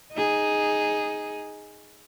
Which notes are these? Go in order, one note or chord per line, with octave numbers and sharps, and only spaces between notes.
D#4 G#4